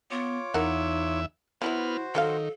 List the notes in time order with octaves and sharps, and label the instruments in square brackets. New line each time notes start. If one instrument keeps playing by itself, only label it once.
[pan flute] B3 [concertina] F4 C#5 D6
[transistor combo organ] E2 E5 [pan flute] D#4 [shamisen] A#4 F#5
[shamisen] E3 F#3 E5 [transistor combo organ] B3 F6 [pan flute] E4 [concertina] F#4 C5
[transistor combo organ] D#3 [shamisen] F3 F#3 F5 [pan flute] A4